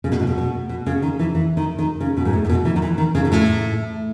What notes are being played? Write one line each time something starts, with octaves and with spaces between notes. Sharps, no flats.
C#3
B2
A2
B2
B2
B2
C#3
D#3
E3
E3
D#3
D#3
C#3
B2
G#2
A2
A2
B2
E3
D#3
E3
D#3
C#3
B2
A2